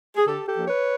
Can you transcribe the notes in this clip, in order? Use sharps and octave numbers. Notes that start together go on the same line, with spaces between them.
G#4
D3 G4 A4
G4 A4
F3 A#3 D4
B4 C#5